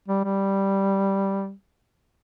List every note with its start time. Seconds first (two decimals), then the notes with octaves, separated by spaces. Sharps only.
0.08 G3
0.24 G3